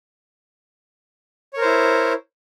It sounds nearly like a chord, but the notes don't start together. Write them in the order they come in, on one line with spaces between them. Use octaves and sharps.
C#5 A#4 C5 E4